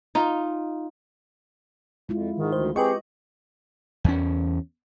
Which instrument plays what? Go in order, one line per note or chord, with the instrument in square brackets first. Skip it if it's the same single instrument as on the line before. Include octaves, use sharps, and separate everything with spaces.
[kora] D#4 F4
[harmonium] F2 [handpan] G#3 E4 F4
[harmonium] G#2 [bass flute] D#3
[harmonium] D2 [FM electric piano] C5
[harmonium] C4 G#4 [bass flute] G4 [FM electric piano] B4 G5 C#6 [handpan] D#5
[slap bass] E2 C#4